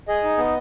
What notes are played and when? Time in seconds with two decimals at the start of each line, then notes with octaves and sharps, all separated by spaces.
0.08 G#4 D#5
0.24 D#4
0.38 B3